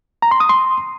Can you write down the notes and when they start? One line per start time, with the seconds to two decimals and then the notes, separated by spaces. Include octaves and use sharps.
0.22 A#5
0.31 C6
0.40 D#6
0.49 C6